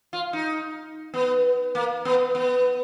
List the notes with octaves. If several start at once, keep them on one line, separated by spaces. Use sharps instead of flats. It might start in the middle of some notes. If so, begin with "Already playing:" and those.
F4
D#4
B3
A#3
B3
B3